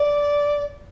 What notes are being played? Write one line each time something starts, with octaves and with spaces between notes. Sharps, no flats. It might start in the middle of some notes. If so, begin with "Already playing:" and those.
Already playing: D5